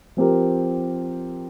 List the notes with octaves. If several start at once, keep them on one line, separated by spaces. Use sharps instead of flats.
F3 C4 G4 A#4